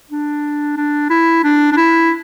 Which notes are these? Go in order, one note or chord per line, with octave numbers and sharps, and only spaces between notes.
D4
D4
E4
D4
D4
E4